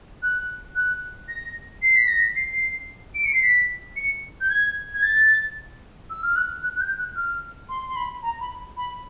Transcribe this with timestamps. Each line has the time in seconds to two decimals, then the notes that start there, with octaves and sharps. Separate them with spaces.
0.22 F#6
0.75 F#6
1.28 A#6
1.82 C7
1.96 B6
2.08 A#6
2.20 B6
2.36 C7
3.15 D7
3.25 C#7
3.33 C7
3.42 B6
3.96 C#7
4.41 G6
4.49 G#6
4.94 G#6
5.02 A6
6.10 E6
6.23 F6
6.36 F#6
6.63 F#6
6.76 F#6
6.81 G6
6.98 F#6
7.16 F6
7.69 C6
7.88 C6
7.96 B5
8.23 A#5
8.40 B5
8.77 B5